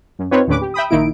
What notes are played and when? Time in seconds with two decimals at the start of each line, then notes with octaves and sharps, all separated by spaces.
0.19 F#2
0.31 C4 D#4 F4 B4 C#5
0.47 D#2 A2 D3 C#4 B4 D6
0.61 G4
0.74 E5 G5 B5 D#6
0.90 A#1 D#3 A#3 D#4 E4 D7